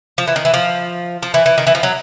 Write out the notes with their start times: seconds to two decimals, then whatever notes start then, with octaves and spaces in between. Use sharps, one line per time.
0.18 F3
0.28 E3
0.36 D#3
0.45 E3
0.54 F3
1.23 F3
1.34 E3
1.46 E3
1.58 D#3
1.67 E3
1.75 F3
1.83 F#3